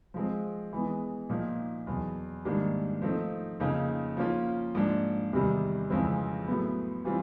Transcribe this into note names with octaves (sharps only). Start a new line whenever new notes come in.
F3 G#3 C4
E3 G#3 B3
A#2 F3 A#3 D#4
E2 B2 F#3
G#2 D#3 G3 A#3 D4
F3 A3 C4 D#4
F2 C#3 F3 A#3 D#4
F3 A#3 C#4 F4
G#2 F3 A#3 D4
E2 C3 D#3 G3
F2 C#3 E3 G#3 C4
A2 F#3 B3
E3 G3 C4 F4